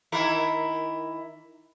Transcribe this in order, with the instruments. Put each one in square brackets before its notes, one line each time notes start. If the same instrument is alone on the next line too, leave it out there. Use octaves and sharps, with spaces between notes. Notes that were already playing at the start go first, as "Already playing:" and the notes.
[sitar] D#3 E4 A#4